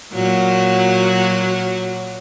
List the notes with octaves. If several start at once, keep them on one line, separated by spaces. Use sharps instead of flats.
A#2 F#3 F#4